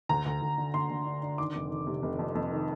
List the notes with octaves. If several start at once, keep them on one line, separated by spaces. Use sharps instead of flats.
D2 A#5
D2
D2
D3
D3 C6
D3
D4
D4
D#3 D6
F1
D#3
C3
F1
F2
F2
D#3